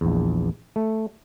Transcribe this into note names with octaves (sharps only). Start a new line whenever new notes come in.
A#1 E2
A3